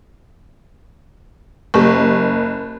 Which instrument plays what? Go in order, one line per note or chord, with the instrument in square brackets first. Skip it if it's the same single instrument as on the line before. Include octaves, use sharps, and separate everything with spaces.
[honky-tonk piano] F#1 [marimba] G4 C#6